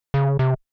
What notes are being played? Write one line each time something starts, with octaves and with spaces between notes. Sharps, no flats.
C#3
C3